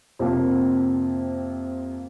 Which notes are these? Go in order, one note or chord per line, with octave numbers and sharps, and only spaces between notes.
F2 C3 F3 A#3